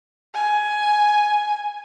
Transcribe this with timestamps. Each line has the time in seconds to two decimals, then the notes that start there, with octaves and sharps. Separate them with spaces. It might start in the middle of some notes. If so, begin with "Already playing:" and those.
0.34 G#5